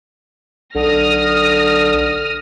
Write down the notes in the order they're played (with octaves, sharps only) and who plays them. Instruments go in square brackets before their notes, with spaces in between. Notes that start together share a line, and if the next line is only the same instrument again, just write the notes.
[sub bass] B1 [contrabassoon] D3 [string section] D#6 F6 A#6